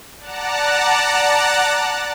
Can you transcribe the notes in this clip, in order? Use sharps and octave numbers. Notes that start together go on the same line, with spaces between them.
D5 F#5 A5 A#5 F#6